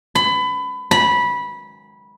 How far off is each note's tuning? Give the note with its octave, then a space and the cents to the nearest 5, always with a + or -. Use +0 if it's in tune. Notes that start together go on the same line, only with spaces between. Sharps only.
B5 +25
B5 -15